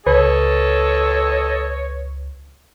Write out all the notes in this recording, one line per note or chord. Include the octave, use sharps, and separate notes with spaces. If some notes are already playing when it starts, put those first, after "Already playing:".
C#2 A4 B4 C#5 D#5